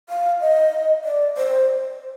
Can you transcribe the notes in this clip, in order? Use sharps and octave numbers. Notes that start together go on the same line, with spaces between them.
F5
D#5
D5
C5